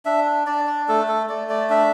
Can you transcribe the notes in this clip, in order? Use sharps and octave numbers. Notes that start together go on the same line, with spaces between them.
D4 E5
D4 D5
D5
A3 A4
A4
A3 D5
D5
D4 E5